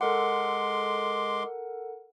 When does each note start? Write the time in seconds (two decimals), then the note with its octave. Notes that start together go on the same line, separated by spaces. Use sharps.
0.01 G#3 A4 A#4 F#5 C6 D6